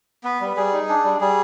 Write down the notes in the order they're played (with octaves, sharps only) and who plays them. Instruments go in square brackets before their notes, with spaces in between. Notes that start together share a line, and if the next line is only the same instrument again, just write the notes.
[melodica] B3 B4
G3
G3 G#4
D#4
D4
G3
G3 G#4